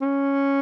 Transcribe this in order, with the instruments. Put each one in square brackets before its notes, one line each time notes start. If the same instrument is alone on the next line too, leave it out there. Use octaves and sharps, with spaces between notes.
[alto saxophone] C#4